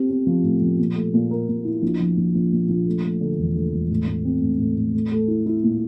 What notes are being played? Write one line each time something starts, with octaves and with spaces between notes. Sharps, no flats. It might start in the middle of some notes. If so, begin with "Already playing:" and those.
Already playing: C4 G4
C4
F3
A2
F3
A#2
A3
A#2
A#4
A#2
E4
A#1
F3
A#1
A#1
A#2
A#1
A3
A3
D3
E1
A3
E1
A2
A2
C4
A2
A2
A2
A3
A3
E4
E4
A#2